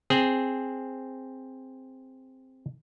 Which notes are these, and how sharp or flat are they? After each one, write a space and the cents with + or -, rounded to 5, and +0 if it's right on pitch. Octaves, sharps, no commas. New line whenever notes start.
C4 +0 G#4 +0